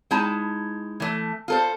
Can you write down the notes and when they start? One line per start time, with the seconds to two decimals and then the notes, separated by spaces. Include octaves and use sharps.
0.11 G#3 D#4 E4 A5
1.00 E3 A3
1.48 F4 A4 C5